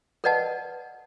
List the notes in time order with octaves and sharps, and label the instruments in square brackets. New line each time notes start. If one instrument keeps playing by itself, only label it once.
[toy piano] A#4 B4 D5 D#5 F#5 A5